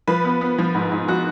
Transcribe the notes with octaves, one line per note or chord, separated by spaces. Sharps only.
F3 B4
B3
B3
F3
G#2
G#2
F3 F#4